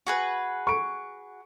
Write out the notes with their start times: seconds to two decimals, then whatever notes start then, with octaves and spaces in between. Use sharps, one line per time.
0.07 F#4 G#4 B4
0.67 C#6 D7